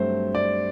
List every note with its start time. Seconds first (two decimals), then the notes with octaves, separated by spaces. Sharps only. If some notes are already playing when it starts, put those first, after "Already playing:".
Already playing: G2 F#3 A3 C4 C5
0.35 D5